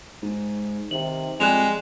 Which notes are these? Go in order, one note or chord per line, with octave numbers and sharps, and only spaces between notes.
G#2
C3 D#3 F#7
F2 G3 G#3 F#6 E7 F7